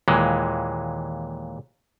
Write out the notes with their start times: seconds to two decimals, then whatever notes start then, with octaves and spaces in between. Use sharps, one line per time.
0.08 D#2 A#2 E3 G#3